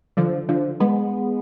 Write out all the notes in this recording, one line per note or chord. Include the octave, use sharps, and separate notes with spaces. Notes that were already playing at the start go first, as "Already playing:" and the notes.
D3 F3
D3 F3
G#3 B3